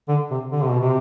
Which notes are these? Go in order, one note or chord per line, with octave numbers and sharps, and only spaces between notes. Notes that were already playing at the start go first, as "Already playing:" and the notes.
D3
C3
D3
C3
B2
C3